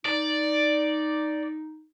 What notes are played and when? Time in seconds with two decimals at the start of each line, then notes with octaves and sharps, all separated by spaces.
0.06 D#4 D5